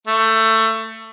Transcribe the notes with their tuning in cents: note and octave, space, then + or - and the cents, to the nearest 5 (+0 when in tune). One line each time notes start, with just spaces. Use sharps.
A3 +20